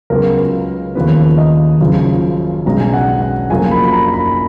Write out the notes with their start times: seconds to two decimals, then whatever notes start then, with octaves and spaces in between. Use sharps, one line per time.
0.10 C#2 C#3 F#3 B3 A#4
0.95 D#2 C#3 F3 B3 B4
1.38 D#5
1.80 F#1 F#2 C#3 F3
2.65 B1 B2 G#3 C#4 A#5
2.80 G#5
2.94 F#5
3.22 F#5
3.50 F#1 F#2 C#3 F3 A#3 G#5
3.71 B5
3.85 B5
3.93 A#5
4.14 B5